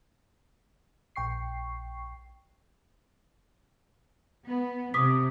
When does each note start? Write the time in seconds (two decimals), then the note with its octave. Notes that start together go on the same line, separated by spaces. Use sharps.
1.16 A#1 G5 C#6 C7
4.46 B3
4.94 C3 D6 D#6 B6